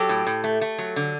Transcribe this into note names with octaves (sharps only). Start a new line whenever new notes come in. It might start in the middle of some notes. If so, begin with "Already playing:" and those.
Already playing: F#3 G4 A4
A2
A2
A3
A3
F#3
D3